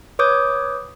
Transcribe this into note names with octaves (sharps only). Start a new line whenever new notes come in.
B4 C#5 D6 D#6 G6